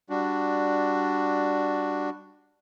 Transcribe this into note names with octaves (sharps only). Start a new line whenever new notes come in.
G3 D4 F#4